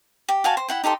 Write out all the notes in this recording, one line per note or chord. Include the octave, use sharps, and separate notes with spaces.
G4
F#4 F5 G#5 A5
C5
E4 F#5 G5
D#4 G4 A4 C6